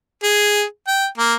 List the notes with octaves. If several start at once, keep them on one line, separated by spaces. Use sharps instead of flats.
G#4
G5
A#3